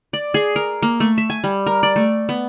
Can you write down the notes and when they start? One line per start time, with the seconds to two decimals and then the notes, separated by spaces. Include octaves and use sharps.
0.13 D5
0.34 G#4
0.56 A#4
0.83 A#3
1.00 A3
1.18 E5
1.30 G#5
1.44 G3
1.66 A#4
1.83 D5
1.96 A3
2.29 B3